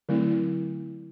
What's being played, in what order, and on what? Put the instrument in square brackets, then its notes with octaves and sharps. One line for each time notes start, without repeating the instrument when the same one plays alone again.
[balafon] D3 F#3 A3 C4 E4